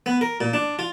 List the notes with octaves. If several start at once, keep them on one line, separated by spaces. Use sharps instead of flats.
B3
A#4
A#2
D4
F4